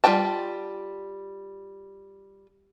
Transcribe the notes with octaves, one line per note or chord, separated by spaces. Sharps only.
G3 F4 A#4 G5 A5